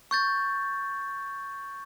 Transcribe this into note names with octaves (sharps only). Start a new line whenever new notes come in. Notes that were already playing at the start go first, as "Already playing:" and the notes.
C#6 G6 A6